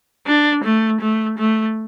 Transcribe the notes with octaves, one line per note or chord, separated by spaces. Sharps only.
D4
A3
A3
A3